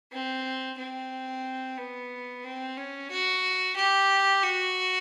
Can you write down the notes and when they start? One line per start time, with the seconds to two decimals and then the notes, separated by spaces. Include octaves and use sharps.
0.12 C4
0.78 C4
1.78 B3
2.44 C4
2.77 C#4
3.10 F#4
3.76 G4
4.42 F#4